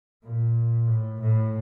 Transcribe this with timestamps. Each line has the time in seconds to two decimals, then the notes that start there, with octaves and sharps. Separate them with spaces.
0.23 A#2
0.87 A2
1.21 A2